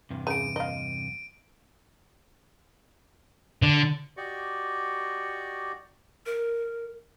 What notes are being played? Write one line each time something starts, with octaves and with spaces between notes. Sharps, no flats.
E2 G2 C3
C#3 D7 D#7
D#5 F5
D3
F#4 G4 D5 D#5 C#6
A#4